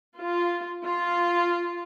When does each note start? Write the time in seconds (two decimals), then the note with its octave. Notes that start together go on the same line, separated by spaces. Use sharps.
0.19 F4
0.83 F4